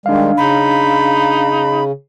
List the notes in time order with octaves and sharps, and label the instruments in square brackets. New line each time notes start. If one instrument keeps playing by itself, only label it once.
[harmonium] D#3 G3 G#3 [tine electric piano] D4 F5
[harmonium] C#3 [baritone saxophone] D#4 [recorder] B5